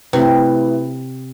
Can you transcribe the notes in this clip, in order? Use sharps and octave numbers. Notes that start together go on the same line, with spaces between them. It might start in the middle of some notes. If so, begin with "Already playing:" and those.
C3 A3 E4 B4